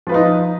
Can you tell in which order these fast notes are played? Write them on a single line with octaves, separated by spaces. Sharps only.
F3 B4 F4 D#4